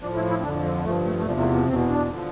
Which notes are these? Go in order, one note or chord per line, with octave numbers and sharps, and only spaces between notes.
A2 F3 D4
E4
E4
C4
F2 D3 F3 D4
C4
G2 F3 A3
A3
A3
E2 C3 F3 G3
A3
B3
E2 B2 C4
D4
D3 F3